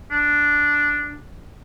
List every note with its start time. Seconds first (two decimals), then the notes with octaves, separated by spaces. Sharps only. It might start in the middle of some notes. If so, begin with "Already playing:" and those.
0.11 D4